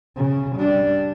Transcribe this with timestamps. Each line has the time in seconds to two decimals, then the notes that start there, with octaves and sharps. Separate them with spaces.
0.17 C#3
0.56 G3 D4